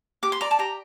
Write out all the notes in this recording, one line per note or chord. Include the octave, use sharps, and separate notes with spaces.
G4 D6
C6
D5 A#5
A5
G4 A#5